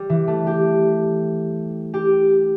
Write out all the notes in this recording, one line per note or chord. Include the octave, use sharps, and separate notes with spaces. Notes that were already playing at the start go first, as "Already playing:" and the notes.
Already playing: G3
E3
A3
G4
G4